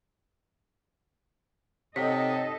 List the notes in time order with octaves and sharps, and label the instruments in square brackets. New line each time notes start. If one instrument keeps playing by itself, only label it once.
[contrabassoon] C3 [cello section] D#4 A4 D#5 [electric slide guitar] C#5 F#5 G5 [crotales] B6